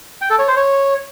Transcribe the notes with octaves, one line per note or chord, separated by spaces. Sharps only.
G5
A4
C#5
C5
C#5